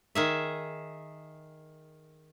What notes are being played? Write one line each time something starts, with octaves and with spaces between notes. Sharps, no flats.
D#3 G#4 E5